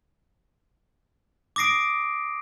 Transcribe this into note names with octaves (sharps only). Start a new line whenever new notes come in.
D6 D#6 A#6 C7 D7